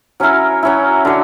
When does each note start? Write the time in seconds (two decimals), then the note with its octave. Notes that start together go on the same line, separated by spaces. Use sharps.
0.20 F#3 C#4 E4 A#4
0.63 F#3 C#4 E4
1.05 D3 F#3